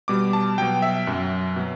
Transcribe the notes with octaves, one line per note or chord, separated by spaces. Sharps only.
B2 G3 D6
A5
B2 F#3 G5
E5
F#2 F#3
B2 F#3